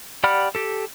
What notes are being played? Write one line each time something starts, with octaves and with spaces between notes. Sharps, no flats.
G4 D5 F#5 B5 F6
G4 A4